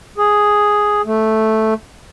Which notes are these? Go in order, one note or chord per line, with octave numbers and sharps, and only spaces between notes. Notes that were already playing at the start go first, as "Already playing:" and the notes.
G#4
A3